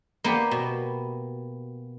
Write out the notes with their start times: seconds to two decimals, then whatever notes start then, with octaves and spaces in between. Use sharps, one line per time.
0.24 A#3 B3 G4
0.51 B2